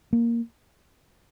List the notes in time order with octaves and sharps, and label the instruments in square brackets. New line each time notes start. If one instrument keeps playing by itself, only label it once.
[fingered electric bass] A#3